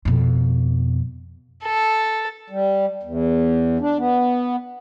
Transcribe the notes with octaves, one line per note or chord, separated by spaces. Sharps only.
F2 B2
A4
G3
E2
D4
B3